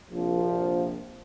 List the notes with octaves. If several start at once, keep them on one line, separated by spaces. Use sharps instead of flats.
A#1 C3 F3